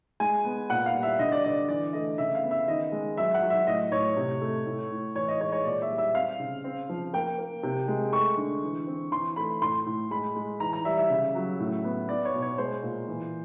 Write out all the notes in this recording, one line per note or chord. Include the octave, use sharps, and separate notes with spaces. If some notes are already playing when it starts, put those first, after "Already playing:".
G#3 G#5
B3
A#2 F#5
F5
G3
E5
D3 D#5
D5
D3 D5
E3 D5
A3 D#5
C#3 E5
F5
B3
E5
D#3 D#5
G#3
F#3 E5
F#5
F#3
E5
A2 D#5
A2 C#5
C3
A3
A2
A2
E3 C#5
D#5
G#3 C#5
C#5
A#2 D5
E5
G3
E5
C4 F5
C#3
C4
F3
A#3 G5
A#3
C3
G#3
A3 C#6
D3
E3
C4
E3 C6
A3 B5
A2 C6
A2
G#3 B5
G#3
E3 A#5
A#5
G3 E5
E5
C#3
F#3
A2
B3
B3 D5
C#5
B2
C#5
G#3 C5
A#2
E3